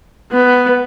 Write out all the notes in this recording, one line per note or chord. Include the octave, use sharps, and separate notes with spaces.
B3